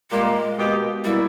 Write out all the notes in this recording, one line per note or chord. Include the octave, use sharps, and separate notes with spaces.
A#2 G3 G#3 A#3
B2 A#3 D#4 G4
B2 G3 A#3 E4